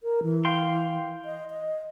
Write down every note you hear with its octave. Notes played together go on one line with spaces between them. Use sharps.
A#4
E3
F5 G5 C6
D#5
D#5